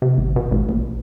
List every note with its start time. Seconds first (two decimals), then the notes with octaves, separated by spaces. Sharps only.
0.02 C3
0.18 G#1
0.36 B2
0.51 A1
0.69 A#1